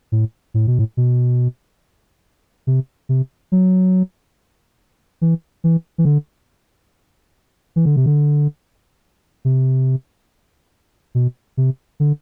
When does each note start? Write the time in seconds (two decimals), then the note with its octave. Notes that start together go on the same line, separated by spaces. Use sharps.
0.12 A2
0.54 A2
0.67 B2
0.79 A2
0.97 B2
2.67 C3
3.09 C3
3.52 F#3
5.21 E3
5.64 E3
5.98 E3
6.05 D3
7.76 E3
7.85 D3
7.96 C3
8.06 D3
9.45 C3
11.15 B2
11.57 C3
12.00 D3